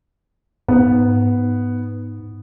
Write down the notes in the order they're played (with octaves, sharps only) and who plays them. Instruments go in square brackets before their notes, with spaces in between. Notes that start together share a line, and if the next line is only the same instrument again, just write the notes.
[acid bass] G#2 [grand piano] B3